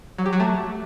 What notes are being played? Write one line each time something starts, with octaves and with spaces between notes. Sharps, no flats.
F#3
G4
F#3
A3